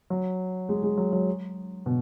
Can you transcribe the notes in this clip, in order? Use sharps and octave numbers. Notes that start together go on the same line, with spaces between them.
F#3
G#3
G#3
F#3
F#3
B2